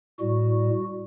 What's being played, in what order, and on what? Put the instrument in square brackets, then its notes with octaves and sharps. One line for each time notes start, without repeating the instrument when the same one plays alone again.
[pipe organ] A2 G3 F#4